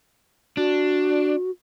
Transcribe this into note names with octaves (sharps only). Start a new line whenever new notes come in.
D4 F#4